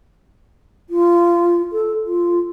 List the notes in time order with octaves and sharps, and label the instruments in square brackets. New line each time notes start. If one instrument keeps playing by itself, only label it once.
[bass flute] F4
A4
F4